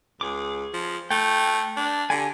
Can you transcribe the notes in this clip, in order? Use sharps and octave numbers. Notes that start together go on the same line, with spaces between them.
C#2 G#4 D6
F3
A3 G5
D4
D3 G4 G#5